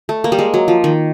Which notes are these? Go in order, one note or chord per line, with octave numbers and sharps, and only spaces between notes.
A3
A#3
G3
G#3
F#3
F3
D#3